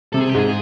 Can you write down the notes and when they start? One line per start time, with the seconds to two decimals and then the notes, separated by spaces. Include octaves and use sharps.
0.13 C3 A4
0.21 G#4
0.29 G4
0.34 G#2 G#4